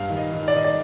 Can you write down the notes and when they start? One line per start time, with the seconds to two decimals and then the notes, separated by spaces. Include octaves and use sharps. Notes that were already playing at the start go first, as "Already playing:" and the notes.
Already playing: G2 F5
0.10 D#3
0.17 D#5
0.32 D#3
0.48 D5
0.54 D#3 D#5
0.64 D5